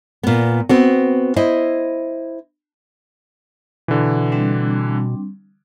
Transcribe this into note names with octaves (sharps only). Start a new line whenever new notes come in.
A#2 B3
B3 C4 F#4
E4 C5 D#5
B2 D3 E3
G3 C4 D4